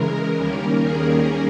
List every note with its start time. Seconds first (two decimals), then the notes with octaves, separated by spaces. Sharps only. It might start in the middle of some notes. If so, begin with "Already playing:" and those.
Already playing: C#3 E3 G#3 A#4
0.37 D#2 D#3 G3 A#3 C#4 A#4
0.82 G#4